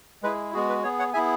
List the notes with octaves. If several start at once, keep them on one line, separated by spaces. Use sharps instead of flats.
G#3 E4 G#4 B4
G#3 B3 F#4 G#4
B4
B3 G#4 C#5
C#5 F#5
B3 E4 G#4 E5 G#5